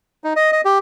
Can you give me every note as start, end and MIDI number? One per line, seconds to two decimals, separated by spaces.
0.24 0.33 63
0.36 0.51 75
0.52 0.61 75
0.65 0.78 67